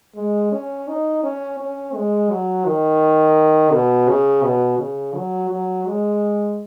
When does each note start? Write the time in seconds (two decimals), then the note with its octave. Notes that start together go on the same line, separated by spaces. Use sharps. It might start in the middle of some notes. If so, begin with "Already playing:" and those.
0.16 G#3
0.52 C#4
0.88 D#4
1.23 C#4
1.59 C#4
1.94 G#3
2.30 F#3
2.66 D#3
3.72 B2
4.08 C#3
4.44 B2
4.79 C#3
5.15 F#3
5.50 F#3
5.87 G#3